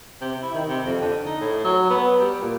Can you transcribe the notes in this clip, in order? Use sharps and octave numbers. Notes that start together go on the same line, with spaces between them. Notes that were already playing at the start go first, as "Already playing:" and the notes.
C3
E4
D#3
C3
F2
D3
D#4
A2
F#3
B3
G3
A#2